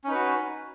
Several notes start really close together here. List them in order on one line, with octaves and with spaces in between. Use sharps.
C#4 D#4 B4 F#4